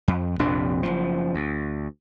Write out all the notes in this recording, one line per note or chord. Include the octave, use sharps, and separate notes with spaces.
F2
A#1 F2 C3 D4
F#1 C#2 F3
D2